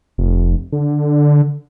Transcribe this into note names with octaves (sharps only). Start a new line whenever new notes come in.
F1
D3